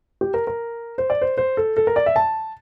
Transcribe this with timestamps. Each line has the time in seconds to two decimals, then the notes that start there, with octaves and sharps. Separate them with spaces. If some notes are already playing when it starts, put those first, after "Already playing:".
0.21 G4
0.34 A#4
0.47 A#4
0.98 C5
1.10 D5
1.21 C5
1.38 C5
1.57 A4
1.77 A4
1.87 A#4
1.96 D5
2.06 E5
2.16 A5